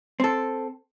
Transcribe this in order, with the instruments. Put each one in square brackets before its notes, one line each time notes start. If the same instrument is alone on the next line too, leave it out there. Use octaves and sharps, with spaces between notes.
[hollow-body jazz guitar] C4 A4